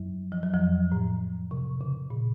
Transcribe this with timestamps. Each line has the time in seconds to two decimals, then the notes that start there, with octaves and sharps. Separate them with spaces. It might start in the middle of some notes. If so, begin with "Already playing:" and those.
Already playing: F#2 F#3
0.32 F3
0.43 F#3
0.53 F2 F3
0.92 A2
1.51 C3
1.81 C#3
2.10 A#2